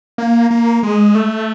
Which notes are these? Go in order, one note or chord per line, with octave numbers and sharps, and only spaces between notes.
A#3
A#3
G#3
A3